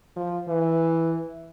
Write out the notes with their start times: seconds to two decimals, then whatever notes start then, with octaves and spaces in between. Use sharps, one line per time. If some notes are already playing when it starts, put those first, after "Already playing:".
0.16 F3
0.48 E3